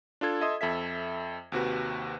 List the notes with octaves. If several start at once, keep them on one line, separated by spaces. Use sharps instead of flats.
D4 F4 A4 G#6
A4 D#5 E5 C6 D#6
F2 A4 E5 B6
D#2 C3 F#4 B4